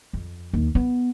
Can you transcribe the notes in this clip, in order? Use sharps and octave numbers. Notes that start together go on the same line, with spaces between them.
F2
D#2
B3